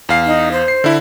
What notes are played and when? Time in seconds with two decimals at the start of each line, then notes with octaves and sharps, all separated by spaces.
0.09 E2 F5 C7
0.26 D#4
0.52 C5
0.68 C7
0.84 D3 E4